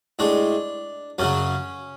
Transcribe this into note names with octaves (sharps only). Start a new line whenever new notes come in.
A2 G#3 D4
F#2 C#3 F#3 C#4